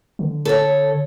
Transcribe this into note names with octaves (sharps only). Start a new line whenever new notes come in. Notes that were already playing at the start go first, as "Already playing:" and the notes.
D3
A4 C#5